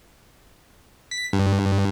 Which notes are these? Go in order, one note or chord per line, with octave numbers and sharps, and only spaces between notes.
B6
G2